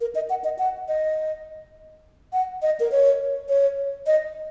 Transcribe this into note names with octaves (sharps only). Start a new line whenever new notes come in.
A#4
D#5
F#5
D#5
F#5
D#5
F#5
D#5
A#4
C#5
C#5
D#5